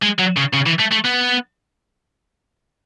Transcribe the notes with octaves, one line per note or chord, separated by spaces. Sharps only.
G#3
F#3
C#3
C#3
E3
A3
A3
B3